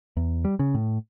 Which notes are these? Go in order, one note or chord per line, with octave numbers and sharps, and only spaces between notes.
E2
G3
C#3
A2